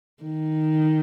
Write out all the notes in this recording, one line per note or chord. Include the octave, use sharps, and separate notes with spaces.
D#3